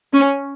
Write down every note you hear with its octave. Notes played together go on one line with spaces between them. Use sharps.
C#4